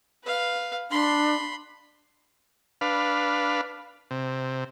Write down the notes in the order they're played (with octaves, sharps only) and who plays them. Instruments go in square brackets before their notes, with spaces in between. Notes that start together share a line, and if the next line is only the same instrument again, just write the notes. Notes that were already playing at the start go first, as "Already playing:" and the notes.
[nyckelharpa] B4 F5
[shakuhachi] D4 [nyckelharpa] B5 C6
[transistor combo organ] D4 B4 F5
C3